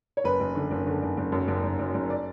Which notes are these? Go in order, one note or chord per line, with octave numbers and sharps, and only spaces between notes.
C#5
F#1 B4
F#1
D3
F#1
D3
F#1
F#1
F#2
F#1
F#1
F#1
F#1
D5